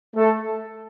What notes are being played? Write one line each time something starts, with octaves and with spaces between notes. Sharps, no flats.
A3 A4